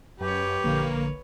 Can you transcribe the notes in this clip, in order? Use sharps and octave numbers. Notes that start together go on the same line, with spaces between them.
F#2 G4 B4 C#5
A#1 D3 A#3